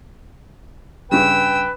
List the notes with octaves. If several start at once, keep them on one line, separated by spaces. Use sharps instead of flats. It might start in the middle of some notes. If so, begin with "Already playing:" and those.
G2 C#3 B4 G5 E6